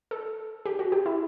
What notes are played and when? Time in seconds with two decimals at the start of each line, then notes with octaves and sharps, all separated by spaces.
0.11 A4
0.66 G4
0.79 F#4
0.92 G4
1.06 E4